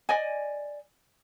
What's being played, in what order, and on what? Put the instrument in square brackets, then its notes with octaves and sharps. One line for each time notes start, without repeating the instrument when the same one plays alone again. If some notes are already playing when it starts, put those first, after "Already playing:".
[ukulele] D5 D#5 G#5